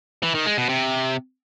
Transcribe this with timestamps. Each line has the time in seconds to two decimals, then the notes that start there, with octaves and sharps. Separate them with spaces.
0.23 E3
0.34 D#3
0.46 G#3
0.57 B2
0.69 C3